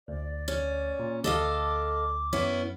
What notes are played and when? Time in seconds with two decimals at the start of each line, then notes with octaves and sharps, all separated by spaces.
0.08 D2 D5
0.48 C#4
0.99 A#2
1.24 D2 A4 D#5 F5 D6
2.33 F#2 B3 C#4 E4